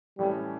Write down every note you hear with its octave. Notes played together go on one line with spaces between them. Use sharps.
A2 E3 G3 A3 C#4